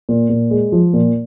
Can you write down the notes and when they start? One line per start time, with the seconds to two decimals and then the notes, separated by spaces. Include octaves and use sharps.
0.09 A#2
0.29 A#2
0.50 G#3
0.72 F3
0.93 A#2